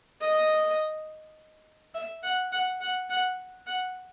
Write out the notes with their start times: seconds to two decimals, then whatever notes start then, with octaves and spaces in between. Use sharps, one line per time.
0.22 D#5
1.95 E5
2.23 F#5
2.52 F#5
2.81 F#5
3.10 F#5
3.67 F#5